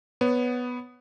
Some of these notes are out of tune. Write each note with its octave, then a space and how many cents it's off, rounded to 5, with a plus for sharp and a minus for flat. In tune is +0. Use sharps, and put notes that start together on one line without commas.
B3 +0 C#5 +0